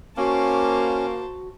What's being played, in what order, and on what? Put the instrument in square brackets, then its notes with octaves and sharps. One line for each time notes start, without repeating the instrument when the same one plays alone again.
[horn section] A#3 [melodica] C#4 [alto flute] F#4 [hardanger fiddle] C5 A5